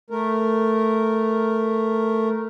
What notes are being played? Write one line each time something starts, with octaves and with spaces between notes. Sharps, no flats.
A3 A#4